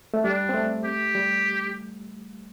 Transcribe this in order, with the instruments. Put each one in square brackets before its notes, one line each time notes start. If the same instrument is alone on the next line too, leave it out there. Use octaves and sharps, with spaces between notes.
[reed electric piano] A3
[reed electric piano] G3 [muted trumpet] D4
[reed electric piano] C4
A3
[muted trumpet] G4
[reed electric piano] G3